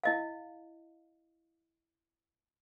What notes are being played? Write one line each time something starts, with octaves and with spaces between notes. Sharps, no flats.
E4 D#5 F5